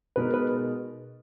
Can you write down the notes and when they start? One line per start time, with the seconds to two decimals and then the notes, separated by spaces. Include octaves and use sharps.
0.16 B2 G#3 B3 D#4 A#4 B4
0.34 B4